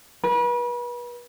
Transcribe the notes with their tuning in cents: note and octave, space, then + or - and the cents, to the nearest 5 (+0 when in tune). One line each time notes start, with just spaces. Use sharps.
B4 -35